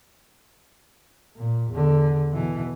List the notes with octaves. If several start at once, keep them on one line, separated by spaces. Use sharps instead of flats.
A#2
E2 D3
B2 E3